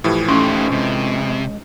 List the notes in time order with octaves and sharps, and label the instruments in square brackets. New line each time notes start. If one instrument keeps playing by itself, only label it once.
[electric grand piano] A2 E3 F3 [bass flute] G4
[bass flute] A3 [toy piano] C#4 C6 C#6 [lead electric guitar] D#4 G4
[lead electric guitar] C3 [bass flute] G#3